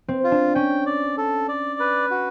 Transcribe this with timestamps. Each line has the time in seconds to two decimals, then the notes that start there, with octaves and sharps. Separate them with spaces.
0.08 C4
0.24 F4
0.32 D4
0.55 C#4 G5
0.86 D5
1.18 A4
1.48 D5
1.80 B4
2.11 F#4